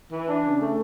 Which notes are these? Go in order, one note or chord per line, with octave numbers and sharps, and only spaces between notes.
E3
D4
C#3
A3